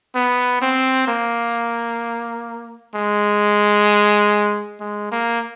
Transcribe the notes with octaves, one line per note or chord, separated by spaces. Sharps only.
B3
C4
A#3
G#3
G#3
A#3